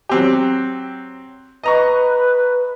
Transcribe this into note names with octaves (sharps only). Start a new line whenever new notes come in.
F#3 C4 G4
B4 D#5 A#5 C#6